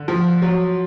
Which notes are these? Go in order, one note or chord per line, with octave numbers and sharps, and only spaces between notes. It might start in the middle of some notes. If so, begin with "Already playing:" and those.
Already playing: D3
F3
F#3